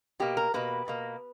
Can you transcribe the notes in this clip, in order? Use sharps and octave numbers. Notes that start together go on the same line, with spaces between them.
B2 A#3 G4
A#4
B2 A#3 B4
B2 A#3